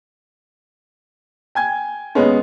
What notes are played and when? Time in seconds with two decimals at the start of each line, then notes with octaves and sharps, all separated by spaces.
1.55 G5 G#5 G#6
2.15 D#2 B2 G#3 B3 C#4